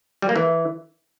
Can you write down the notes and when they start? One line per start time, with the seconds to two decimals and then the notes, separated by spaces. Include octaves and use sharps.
0.22 G3
0.29 A#3
0.36 E3